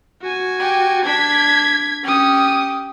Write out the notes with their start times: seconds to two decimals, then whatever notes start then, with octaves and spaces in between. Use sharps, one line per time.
0.22 F#4 G#5
0.60 G4
1.05 D4 G#6 B6
2.04 C#4 G4 D#6